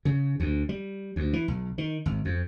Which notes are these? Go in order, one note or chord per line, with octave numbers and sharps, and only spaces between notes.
C#3
D2
G3
D2
E3
B1
D#3
G#1
F2